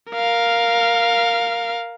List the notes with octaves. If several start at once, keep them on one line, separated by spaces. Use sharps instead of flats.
A#4 F5